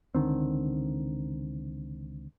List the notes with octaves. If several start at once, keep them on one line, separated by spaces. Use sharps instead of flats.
C#2 D3 D#3 C4